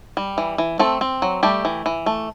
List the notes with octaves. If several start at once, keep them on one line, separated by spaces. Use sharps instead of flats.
G3
E3
E3
A3 C4 A4
C4
F#3
G3 A3 G4
E3
E3
A3